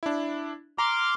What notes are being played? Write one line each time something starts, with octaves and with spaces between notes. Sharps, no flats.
D4 E4
A#5 C6 D6 F6